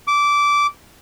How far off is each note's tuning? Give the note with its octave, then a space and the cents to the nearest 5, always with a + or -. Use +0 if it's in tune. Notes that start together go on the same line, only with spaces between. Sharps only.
D6 -15